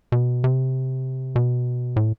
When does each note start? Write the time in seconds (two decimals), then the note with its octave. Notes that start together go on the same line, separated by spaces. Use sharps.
0.12 B2
0.44 C3
1.36 B2
1.96 A2